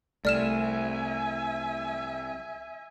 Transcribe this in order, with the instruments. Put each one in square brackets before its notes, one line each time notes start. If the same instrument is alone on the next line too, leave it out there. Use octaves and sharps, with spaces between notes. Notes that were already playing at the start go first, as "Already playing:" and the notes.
[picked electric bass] C2 [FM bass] A3 [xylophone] D5 F6 E7 [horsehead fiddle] E5 G#5